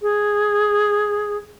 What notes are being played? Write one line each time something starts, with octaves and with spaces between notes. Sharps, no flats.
G#4